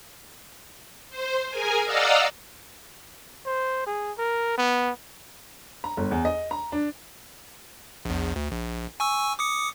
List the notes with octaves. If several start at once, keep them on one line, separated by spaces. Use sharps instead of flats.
C5
G#4 A#4 G#5
D5 D#5 F5 F#5 A#5 E6
C5
G#4
A#4
B3
A#5
G1
E2
D#5
A#5
D4
A#1 E2
D2
A#1
G#5 C#6 E6
D6 D#6 C#7